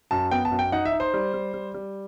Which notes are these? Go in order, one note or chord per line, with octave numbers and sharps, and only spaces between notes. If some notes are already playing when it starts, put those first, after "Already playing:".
F#2 A5
B3 G5
A5
F#2
G5
D#4 F#5
E5
D#4
C5
G3
G3
G3
G3